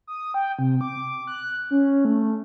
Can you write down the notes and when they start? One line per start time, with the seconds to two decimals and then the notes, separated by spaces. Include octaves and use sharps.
0.07 D#6
0.34 G5
0.59 C3
0.81 D6
1.27 F#6
1.71 C#4
2.05 A3